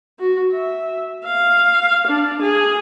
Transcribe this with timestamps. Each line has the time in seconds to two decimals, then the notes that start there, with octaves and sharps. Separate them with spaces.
0.19 F#4
0.52 E5
1.25 F5
2.07 D4
2.42 G#4